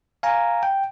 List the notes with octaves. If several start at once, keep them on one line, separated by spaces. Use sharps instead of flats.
F5 G#5 A#5
G5